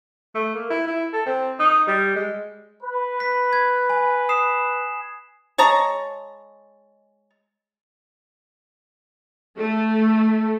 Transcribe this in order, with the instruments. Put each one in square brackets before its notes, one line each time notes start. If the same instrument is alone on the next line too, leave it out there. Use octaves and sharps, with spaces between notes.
[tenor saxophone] A3
A#3
E4
E4
A4
C4
D#4
G3
G#3
[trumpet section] B4
[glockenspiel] B6
G#6
G#5
D#6 C7 E7
[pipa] G#3 C#5 A5 A#5
[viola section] A3